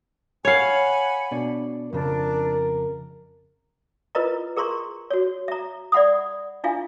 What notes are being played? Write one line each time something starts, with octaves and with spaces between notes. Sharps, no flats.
C#5 F5 F#5 G#5 B5
B2 D4
F2 C#3 D4 A#4
E4 F4 A#4 B4 D#5 A#5
G#4 A#4 A#5 C6 C#6
F#4 C#5
E5 A#5
D5 E5 F#5 B5 D#6
D4 E4 F4 E5 F5 G#5